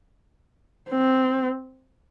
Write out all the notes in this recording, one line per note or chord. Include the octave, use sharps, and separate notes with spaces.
C4